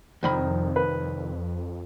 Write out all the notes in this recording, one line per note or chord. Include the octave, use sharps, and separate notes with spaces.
C2 F2 D#3 B5
B4